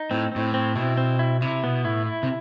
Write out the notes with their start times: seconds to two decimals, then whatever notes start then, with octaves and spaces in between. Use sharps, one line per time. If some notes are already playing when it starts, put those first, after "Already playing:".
Already playing: D#4
0.11 A2 C4
0.32 A2 C4
0.54 C4
0.75 B2 E4
0.97 C4
1.19 E4
1.41 C3 E4
1.63 B2 B3
1.84 A2 E4
2.06 E4
2.23 C3